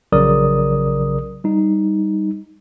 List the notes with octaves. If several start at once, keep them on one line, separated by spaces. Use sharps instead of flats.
A#1 C#3 F#3 A#4 D5 D#6
G3 D#4